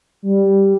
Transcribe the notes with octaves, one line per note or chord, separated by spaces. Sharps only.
G3